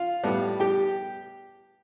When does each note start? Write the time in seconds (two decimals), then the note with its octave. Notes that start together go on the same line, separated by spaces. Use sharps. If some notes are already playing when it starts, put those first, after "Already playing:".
Already playing: F4 F5
0.23 A2 G3 B3
0.60 G4 G5